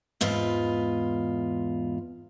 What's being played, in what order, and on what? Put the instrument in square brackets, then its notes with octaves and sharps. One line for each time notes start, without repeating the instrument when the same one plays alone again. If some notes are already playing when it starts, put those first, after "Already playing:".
[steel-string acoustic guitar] E2 G#2 F4 B4